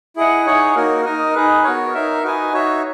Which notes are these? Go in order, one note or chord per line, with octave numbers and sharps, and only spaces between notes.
E4 G#4 D#5 F#5
D#4 G#4 C#5 F#5
A#3 D#4 F#4 A#4
D#4 A#4 D#5
D#4 G#4 B4
B3 F#4 A#4 C#5
D#4 A#4 E5
D#4 F#4 B4 D#5 G#5
D#4 F#4 C#5 E5